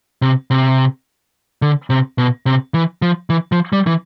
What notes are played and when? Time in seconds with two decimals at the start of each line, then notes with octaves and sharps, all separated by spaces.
0.22 C3
0.51 C3
1.62 D3
1.90 C3
2.18 B2
2.46 C3
2.74 E3
3.02 F3
3.30 E3
3.52 F3
3.73 G3
3.87 E3